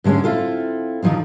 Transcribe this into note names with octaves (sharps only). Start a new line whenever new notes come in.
G#2 D3 G#3 A3 C#4
C4 E4 F4 A4
D3 D#3 F3 F#3 C4